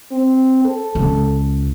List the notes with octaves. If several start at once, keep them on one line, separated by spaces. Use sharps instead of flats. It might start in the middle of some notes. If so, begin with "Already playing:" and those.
C4
A4
C#2